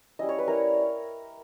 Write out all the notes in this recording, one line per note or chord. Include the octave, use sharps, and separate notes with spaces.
G3 C#4 E4 D#5
C#5
B4
G3 C#4 E4 A#4